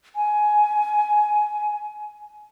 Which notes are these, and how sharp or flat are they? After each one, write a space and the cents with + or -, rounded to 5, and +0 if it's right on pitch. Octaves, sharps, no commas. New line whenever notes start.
G#5 +15